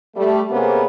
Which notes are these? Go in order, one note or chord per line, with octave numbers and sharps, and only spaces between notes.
G3 A3
C3 A#3 B3 C#4 G#4 C5